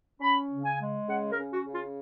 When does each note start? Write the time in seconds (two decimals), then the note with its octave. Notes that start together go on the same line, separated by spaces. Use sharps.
0.19 C#4 B5
0.49 C#3
0.63 G#5
0.78 G#3
1.07 C#3 F#5
1.29 A#4
1.36 C#4
1.49 F#4
1.64 C#3
1.72 F4